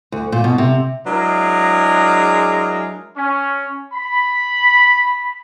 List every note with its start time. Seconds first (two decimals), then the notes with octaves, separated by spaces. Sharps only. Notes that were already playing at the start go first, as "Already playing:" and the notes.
0.12 D2
0.32 A#2
0.44 B2
0.58 C3
1.07 F#3 G#3 D4 E4 G#4 A#4
3.17 C#4
3.94 B5